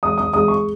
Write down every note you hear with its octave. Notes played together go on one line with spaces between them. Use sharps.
G#3 D#6
D#6
G#3 D#6
C#6